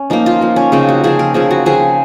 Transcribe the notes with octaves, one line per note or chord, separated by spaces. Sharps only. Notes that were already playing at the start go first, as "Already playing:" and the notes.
Already playing: C#4
F3 A#3 D#4
F4
F3 A#3
C#4
C#3 F3 C4 D#4
F#4
C#3 F3 C4 G#4
A#4
C#3 F3 C4 G#4
F#4
C#3 F3 C4 G#4